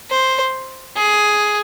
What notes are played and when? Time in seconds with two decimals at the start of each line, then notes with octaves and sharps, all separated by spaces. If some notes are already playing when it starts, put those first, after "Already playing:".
0.11 C5
0.96 G#4